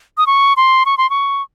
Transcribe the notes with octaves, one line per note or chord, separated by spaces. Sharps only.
D#6
C#6
C6
C#6
C6
C#6